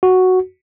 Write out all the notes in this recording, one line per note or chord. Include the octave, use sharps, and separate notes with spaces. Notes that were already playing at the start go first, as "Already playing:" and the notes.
F#4